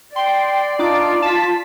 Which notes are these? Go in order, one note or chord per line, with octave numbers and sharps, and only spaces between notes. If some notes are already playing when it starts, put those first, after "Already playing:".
D5 G5 C6
D4 D#4 F4 D6
A5 B6